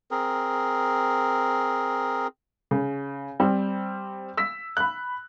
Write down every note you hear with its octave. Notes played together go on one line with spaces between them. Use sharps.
C4 G#4 A#4
C#3
G3 C4
E6 B6
B5 F#6